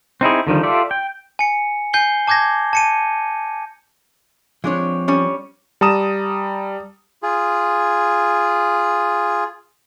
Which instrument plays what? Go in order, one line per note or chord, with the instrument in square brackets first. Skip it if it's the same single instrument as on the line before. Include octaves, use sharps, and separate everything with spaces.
[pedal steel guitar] C4 D#4 E4 G#4
D3 D#3 F3 G3
F4 G4 A4 D5 E5
G5
[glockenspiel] G#5 C#7
G#5 G6 C7 G7
A5 D6 G6 G#6 A#6
A5 C#7 D#7
[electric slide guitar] F3 C4 [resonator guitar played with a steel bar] G#3 D4 C#5
[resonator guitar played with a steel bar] G3 C#4
[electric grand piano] G3 A5 A#5 D#6 E7
[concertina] F4 G#4